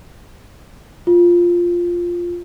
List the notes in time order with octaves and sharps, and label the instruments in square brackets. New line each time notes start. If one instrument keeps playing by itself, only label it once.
[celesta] F4